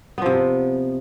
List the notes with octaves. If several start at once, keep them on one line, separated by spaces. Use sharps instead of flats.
C3 F3 B3